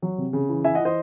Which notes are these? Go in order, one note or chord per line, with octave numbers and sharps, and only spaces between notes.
F#3
C3
C#3
E3
E3 E5 G#5
D#5 F#5
E3
C5 D#5